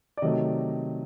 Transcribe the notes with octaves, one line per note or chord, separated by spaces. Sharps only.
D5
C3 D#3 F#3 A3 D#5